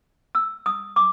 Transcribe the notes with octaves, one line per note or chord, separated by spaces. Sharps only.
E6
D#6
D6